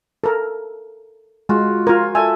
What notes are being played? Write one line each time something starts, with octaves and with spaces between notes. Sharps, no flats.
A4 A#4
G#3 F4 F#4
F4 A#4 G#5
A4 E5 G#5